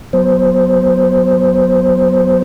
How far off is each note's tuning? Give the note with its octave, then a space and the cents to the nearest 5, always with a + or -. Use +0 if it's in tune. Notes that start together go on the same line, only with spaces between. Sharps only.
F#3 +0 B3 +0 C5 +0